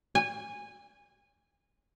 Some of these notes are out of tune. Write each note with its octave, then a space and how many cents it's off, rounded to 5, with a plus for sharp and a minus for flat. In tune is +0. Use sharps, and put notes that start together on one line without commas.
G#5 -20